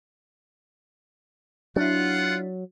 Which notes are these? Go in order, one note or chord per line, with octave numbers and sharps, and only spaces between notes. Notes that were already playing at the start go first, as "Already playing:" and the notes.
F#3 D4 E4 F4 F#5